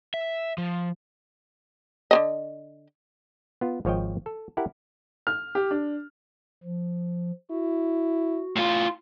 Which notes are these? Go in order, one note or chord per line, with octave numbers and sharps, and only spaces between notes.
E5
F3
D3 D#3 D#5
B3 F4
G#1 F3 C#5 D#5 G5
A4
E4 G4 A#4 F#5
F6
G4
D4
F3
E4 F#4
A2 F4